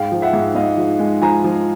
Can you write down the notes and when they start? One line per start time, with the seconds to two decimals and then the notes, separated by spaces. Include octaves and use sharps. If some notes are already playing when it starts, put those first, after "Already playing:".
Already playing: G#2 F5 G5
0.12 F3
0.22 E5 F#5
0.33 G#2
0.55 G#2 D#5 F5
0.77 F3
0.99 G#3
1.22 F3 G#5 A#5
1.44 F3